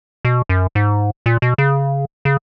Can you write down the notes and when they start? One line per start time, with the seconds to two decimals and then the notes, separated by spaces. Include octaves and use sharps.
0.25 B2
0.49 F#2
0.75 G#2
1.26 A#2
1.42 B2
1.58 C#3
2.25 C#3